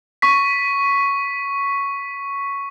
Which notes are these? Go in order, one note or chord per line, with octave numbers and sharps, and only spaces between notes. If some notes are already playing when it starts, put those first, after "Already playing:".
C#6 B6